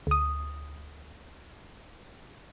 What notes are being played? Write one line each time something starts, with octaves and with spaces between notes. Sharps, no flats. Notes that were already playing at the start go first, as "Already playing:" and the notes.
D2 D#6